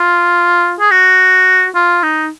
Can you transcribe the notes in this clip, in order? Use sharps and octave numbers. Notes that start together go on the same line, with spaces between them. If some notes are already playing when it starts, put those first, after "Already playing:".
Already playing: F4
G#4
F#4
F4
D#4